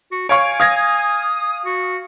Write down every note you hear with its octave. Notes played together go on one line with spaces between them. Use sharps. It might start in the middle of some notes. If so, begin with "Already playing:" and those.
F#4
C#5 F5 G#5 C#6 D7
F5 D#6 G#6 A#6
F#4